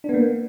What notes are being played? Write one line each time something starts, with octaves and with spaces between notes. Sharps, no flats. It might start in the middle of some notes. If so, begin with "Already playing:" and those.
A#3 B3 D4